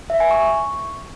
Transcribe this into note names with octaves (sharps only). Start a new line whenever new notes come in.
E5
G#5
C#6